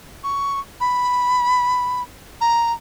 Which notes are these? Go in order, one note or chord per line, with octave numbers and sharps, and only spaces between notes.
C#6
B5
A#5